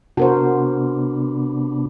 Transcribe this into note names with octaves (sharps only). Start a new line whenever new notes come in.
C3 B3 D4 F#4 A#4 C5